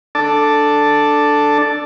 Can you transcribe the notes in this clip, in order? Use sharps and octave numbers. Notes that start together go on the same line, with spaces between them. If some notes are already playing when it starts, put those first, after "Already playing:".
D4 A4 D5 A5